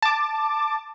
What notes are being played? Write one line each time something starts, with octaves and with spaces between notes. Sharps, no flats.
A5 D6